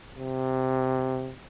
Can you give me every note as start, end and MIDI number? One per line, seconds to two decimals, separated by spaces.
0.16 1.33 48